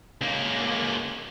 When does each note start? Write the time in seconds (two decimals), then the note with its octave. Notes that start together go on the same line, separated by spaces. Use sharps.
0.21 C#2 A#3